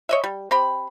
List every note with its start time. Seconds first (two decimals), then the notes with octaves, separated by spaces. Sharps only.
0.09 C#5 D#5 E5
0.24 G3
0.51 C4 G4 B5